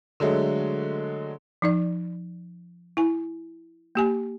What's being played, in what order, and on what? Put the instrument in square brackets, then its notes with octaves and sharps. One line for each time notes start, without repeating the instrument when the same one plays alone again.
[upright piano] D3 F#3 G#3 A3
[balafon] F3 D#4 D5
E4 G#5
A#3 G4 G#5